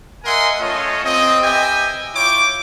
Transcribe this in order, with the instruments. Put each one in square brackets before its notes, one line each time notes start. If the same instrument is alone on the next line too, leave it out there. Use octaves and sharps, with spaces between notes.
[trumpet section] A#4 D#5 E5 F#5 G#5 C6
A3 C#4 F4 A4 C#5 D#5
C4 D#5
G4 B4 D#5 E5 G5 G#5
E4 F4 C#5 G5 D6